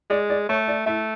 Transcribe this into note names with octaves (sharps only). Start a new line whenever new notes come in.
G#3 D5
D5
A3 C#5
D5
A3 E4 E5